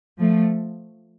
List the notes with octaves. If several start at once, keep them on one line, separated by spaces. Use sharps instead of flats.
F3 A3